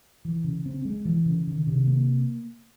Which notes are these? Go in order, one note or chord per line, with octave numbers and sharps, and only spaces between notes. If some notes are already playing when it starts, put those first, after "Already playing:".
E3
C#3
C4
G#3
E3
C#3
D#3
C3
A#3